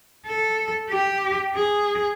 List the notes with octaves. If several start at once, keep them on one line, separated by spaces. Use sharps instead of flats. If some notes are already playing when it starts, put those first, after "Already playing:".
A4
G4
G#4